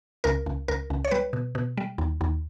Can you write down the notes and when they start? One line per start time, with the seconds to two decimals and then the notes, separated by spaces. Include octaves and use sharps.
0.24 C#2 A#4
0.46 C#2
0.68 C#2 A#4
0.90 C#2
1.05 C#5
1.11 G3 B4
1.33 B2
1.55 B2
1.77 G3
1.98 D#2
2.21 D#2